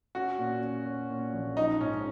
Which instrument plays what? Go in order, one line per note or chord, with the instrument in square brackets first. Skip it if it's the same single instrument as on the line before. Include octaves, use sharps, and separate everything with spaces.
[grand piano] C#4 [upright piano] F#4
[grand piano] A#2
C#4
C#4
A#2
A#1
[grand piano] F3 [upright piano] D#4
[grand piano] G#2 [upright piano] C#4